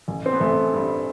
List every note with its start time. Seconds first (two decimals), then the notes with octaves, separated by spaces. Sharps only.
0.08 A1
0.26 C4
0.33 B3
0.40 A1 A3
0.73 G2